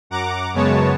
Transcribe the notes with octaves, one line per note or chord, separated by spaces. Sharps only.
F#2 F#5 A#5 D6
F#2 C#3 G#3 B3 C#5 A5